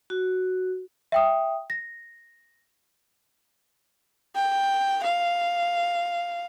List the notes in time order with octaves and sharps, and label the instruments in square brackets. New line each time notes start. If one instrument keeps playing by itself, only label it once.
[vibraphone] F#4
[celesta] E5 G5 D#6
A#6
[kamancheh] G5
F5